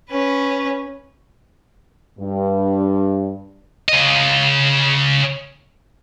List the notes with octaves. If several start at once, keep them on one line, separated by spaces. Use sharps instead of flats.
C#4 B4
G2
C#3 D#5